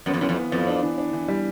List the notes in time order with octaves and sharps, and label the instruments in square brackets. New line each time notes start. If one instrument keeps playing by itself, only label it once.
[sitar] F#2 [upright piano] B3
[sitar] F2
[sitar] F#2 [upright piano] E3
[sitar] F2
[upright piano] B3
[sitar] F2 [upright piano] B3
[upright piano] D4
E3
D4
E3
G3